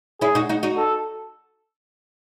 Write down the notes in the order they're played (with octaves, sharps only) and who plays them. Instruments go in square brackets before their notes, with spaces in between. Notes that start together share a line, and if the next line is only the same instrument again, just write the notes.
[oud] C#4 E4 [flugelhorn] G#4
[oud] D#4 F#4
D#4 F#4
D#4 F#4
[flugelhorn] A4